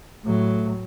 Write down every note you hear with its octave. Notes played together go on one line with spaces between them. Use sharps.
A2 F#3 A3